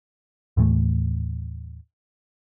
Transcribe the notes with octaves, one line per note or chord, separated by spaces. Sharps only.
D#2 A2 E3 A3